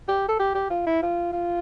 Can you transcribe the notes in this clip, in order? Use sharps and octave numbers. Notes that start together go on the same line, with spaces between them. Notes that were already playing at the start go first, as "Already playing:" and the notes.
G4
A4
G4
G4
F4
E4
F4
F4